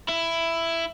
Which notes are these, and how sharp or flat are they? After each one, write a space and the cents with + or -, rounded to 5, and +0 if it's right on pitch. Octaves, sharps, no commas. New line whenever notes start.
E4 +10